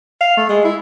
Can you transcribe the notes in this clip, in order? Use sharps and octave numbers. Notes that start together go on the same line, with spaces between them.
F5
A3
G#3
E4